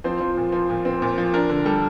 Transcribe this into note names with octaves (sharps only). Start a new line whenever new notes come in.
F3 C4 C5
F3
A#2
F3
A#2
C4
A#2
F3
D4 A#4
D3
G3 A4